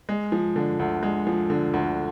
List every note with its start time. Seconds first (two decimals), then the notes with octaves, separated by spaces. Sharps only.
0.09 G#3
0.32 F3
0.56 D3
0.79 D2
1.03 G#3
1.27 F3
1.50 D3
1.74 D2